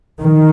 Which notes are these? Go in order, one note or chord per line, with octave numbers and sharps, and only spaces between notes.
D#3